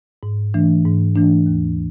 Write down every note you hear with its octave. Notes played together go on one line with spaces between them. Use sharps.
G#2
E3 A3 D4
G#2
E3 A3 D4
D#2